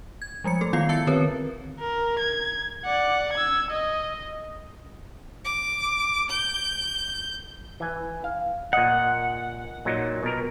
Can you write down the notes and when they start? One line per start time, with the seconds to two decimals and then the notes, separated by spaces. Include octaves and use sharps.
0.22 G#6
0.44 F3 G3 G#3 C#7
0.61 A3 A4
0.73 D#3 B3 E4 F4 F5 C7
0.89 E5 A5 E6 A6 C#7
1.07 D3 D#3 C4 A#4 B4 C#5
1.79 A#4
2.19 G#6
2.85 D5 F#5
3.33 E6 G#6
3.71 D#5
5.45 D6
6.30 G6
7.80 E3 G#5
8.24 F5
8.73 A#2 D#5 F#5
9.85 A#2 F#3 D#4
10.23 B2 A#4